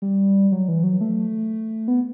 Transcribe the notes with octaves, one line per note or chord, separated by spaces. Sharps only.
G3
F#3
E3
F#3
A3
B3